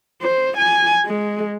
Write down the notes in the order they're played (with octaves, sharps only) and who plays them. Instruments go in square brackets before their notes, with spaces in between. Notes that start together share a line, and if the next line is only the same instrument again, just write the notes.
[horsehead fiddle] C5
G#5
G#3